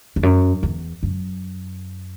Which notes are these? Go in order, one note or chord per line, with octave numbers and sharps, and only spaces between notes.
E2
F#2
E2
F#2